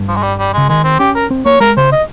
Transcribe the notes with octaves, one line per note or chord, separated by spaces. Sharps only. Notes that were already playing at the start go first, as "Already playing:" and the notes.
Already playing: G2
F3
G#3
G3
G3
C#3 G#3
D#3 G#3
C4
C#4 G4
A#4
C4
A#3 C#5
G#3 A#4
C#3 C5
D#5